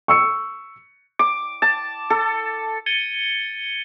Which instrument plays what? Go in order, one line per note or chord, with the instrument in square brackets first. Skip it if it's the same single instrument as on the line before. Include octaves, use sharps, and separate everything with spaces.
[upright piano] C#6 E6 C#7
[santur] D6
A5
A4
[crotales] G#6 A6 C#7 D#7 G7